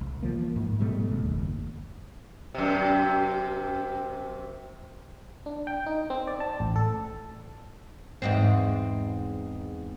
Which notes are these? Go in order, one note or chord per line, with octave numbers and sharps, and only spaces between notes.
C2
E3 F3 A#3
G#2
G#2 B2 G3 A3
C#2
F#1 D#2
F#2 C3
D4
G5
D#4
C4
D5
A5
A1
A4
E2 G#2 C4